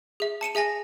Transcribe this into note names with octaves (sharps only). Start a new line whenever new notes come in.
G#4 E5
A5 C#7 D#7 E7
G#4 E5 G#5 A#6